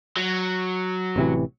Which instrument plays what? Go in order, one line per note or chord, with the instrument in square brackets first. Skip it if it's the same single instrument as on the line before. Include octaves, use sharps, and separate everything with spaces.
[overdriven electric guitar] F#3
[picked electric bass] A1 C3 E3